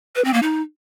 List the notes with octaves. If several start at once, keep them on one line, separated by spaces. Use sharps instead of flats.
B4
C4
A#3
D#4